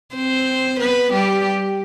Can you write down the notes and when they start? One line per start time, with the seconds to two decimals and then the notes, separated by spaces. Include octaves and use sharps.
0.15 C4 C5
0.80 B3 B4
1.12 G3 G4